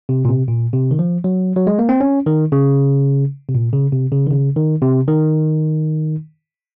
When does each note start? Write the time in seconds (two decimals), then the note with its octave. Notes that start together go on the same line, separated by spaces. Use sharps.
0.09 C3
0.25 A#2
0.29 C3
0.48 A#2
0.73 C3
0.91 D#3
0.99 F3
1.24 F#3
1.56 F#3
1.67 G#3
1.79 A#3
1.89 C4
2.01 C#4
2.26 D#3
2.52 C#3
3.49 C3
3.55 A#2
3.73 C#3
3.92 C3
4.12 C#3
4.27 D#3
4.31 C#3
4.57 D#3
4.82 C3
5.08 D#3